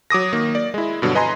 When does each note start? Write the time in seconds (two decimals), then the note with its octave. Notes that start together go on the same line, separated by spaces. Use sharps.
0.10 F#3 D6 D#6 A#6
0.33 D#3 A#3
0.55 D5
0.74 G#3 E4
1.02 G2 B2 D3 F#3
1.15 B4 D#5 G#5 A#5 C6